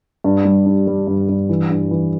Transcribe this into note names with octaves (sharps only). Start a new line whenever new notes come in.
G2
G3
D4
G3
G2
G2
E3
G2
E3